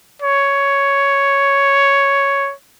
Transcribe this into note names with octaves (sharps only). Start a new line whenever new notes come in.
C#5